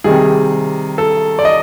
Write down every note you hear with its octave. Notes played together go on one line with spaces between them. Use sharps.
C3 D#3 G3 G#4
A4
D5
D#5